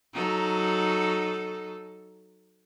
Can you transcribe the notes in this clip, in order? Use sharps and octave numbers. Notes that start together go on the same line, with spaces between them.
F#3 D#4 A4